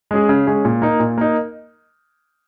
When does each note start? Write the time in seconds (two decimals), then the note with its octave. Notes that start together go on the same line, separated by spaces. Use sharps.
0.11 G#3 C#4 G#4
0.29 C#3
0.47 G#3 C#4 G#4
0.65 A#2
0.82 A#3 D#4
1.00 A#2
1.18 A#3 D#4